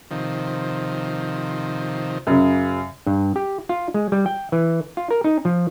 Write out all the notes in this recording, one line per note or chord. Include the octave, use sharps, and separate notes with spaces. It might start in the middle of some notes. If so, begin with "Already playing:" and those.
C3 D#3 F3
F#2 C#3
G2
G4
F4
G#3
G3
G5
E3
F4
A#4
D#4
F3